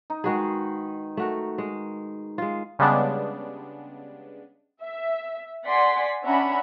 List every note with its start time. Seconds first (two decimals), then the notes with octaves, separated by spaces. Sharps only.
0.10 D#4
0.24 D#3 G#3 F#4 G#4 B4
1.17 A3 F#4 A#4
1.58 G#3
2.38 G#3 F4
2.79 C#3 G3 G#3 B3 D4
4.81 E5
5.66 D5 F#5 G#5 C6 B6
6.23 C#4 D4 E5 F#5 A#5 B5